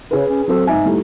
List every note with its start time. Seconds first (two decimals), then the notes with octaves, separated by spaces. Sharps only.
0.11 C#3 G#4 B4
0.28 C#4
0.48 F#3 C4 A4
0.67 G#2 D#4 E5 G#5
0.85 G3 A3 E4